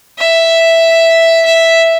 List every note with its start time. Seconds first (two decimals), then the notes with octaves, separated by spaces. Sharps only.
0.18 E5
1.45 E5